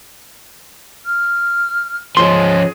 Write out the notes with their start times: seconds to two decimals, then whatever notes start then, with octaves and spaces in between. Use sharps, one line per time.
1.05 F6
2.17 F3 C#4 G#4 C6